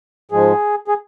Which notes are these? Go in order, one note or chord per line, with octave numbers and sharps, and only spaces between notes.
G#2 F3 G#3 G#4
G#4